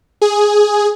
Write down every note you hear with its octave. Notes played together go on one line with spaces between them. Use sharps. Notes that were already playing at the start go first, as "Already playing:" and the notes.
G#4